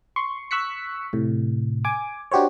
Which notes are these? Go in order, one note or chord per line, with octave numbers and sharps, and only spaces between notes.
C6 C#6
C#6 E6 F#6 B6 C#7
A2 C3
G#5 D6
D4 F#4 G4 C5 C#5